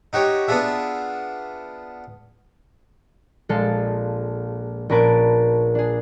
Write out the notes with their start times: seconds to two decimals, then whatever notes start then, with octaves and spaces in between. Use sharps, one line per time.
0.13 D#4 F#4 G4 C#5
0.48 B3 D4 F4 G#4 E5
3.49 A#1 G#3 A4 F5
4.89 A#1 C#4 A#4 B4 A5 D7
5.75 D4 G#4